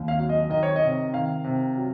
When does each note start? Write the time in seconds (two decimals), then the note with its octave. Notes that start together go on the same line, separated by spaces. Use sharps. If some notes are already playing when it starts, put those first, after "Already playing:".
Already playing: D#2
0.08 F5
0.18 F#3
0.29 D#5
0.50 D#3 D#5
0.63 C#5
0.76 D#5
0.82 C3
1.13 D#3 F5
1.44 C3
1.77 F#3